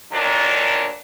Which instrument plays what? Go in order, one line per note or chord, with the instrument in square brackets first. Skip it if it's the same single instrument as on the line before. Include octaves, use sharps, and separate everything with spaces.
[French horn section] D2 A#2 D#3 F#3 D4